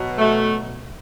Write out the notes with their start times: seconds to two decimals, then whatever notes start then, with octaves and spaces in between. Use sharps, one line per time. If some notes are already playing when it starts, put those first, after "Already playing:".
Already playing: B2 F#3
0.18 A3